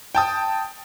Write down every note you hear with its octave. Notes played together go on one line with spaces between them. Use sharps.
G5 A5 D#6